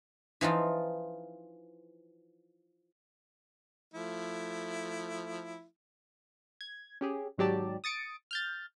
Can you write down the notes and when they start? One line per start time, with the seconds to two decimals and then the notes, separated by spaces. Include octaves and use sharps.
0.41 E3 F3 D#4 F4
3.94 F3 A3 E4
6.61 G#6
7.01 C#4 G4 G#4
7.38 G#1 G#2 F#3 G4 D5 A5
7.84 D#6 A6 C#7 D7
8.31 F6 G6 A6